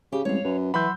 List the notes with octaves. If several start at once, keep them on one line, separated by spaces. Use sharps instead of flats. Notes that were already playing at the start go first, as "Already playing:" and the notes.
C#3 G4
A1 G3 G#3 C4 C#5 F5
F#2 B4
E3 F#3 F#5 B5 C6 E6 G6